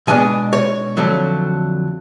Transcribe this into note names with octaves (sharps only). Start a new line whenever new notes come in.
B2 G#3 B3 D4 G#5
C#5
F2 D3 F#3 A3